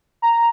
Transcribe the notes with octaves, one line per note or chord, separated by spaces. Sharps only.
A#5